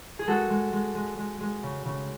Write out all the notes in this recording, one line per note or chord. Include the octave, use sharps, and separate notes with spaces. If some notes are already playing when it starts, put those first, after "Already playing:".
G#4
G#3 F#4 A4
G#3
G#3
G#3
G#3
G#3
C#3
C#3